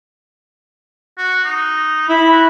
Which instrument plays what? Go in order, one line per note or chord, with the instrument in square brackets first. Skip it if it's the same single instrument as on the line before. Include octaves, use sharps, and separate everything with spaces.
[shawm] F#4
D#4
[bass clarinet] E4 [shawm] B5
[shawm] F#4